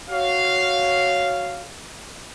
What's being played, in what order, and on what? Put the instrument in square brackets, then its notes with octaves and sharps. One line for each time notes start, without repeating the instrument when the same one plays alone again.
[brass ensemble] F#4 C#5 F5